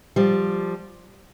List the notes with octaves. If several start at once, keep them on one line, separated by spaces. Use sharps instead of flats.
F3 G3